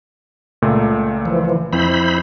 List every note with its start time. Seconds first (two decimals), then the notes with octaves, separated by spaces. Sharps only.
0.62 C#2 A#2 A3
1.26 E3 F3
1.73 F2 E4 C5 B5